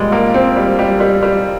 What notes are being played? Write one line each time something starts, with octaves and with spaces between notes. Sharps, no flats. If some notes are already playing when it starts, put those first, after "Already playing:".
Already playing: A#2 F3 G3 G#3
A#3
C4
G3
G3
G3
G3